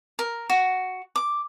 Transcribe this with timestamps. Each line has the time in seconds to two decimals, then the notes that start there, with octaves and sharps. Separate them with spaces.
0.19 A#4
0.50 F#4
1.16 D6